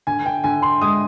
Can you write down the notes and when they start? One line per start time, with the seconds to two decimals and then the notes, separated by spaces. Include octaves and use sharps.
0.07 D3 G#5
0.26 G5
0.44 D3 G#5
0.62 C6
0.82 G#3 D#6